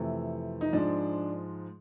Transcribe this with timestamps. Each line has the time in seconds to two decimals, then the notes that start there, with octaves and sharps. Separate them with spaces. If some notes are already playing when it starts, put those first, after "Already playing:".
Already playing: F2 C3 E3 A3
0.61 D#4
0.73 G#2 F3 G#3 D4